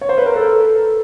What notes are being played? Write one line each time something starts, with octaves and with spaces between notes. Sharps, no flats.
C#5
C5
B4
A#4
A4